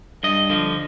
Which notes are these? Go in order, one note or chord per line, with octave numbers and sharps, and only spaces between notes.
G2 D#5
D3 F3